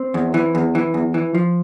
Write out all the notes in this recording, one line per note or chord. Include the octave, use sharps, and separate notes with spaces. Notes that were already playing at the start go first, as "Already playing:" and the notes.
Already playing: C4
E2
E3
E2
E3
E2
E3
F3